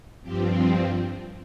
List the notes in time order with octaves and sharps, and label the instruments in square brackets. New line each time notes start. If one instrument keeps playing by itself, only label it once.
[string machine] G2 F3 C4 G4